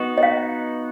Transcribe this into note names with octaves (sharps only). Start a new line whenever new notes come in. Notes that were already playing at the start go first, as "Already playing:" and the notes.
Already playing: B3 D#4 F#4
D#5
F5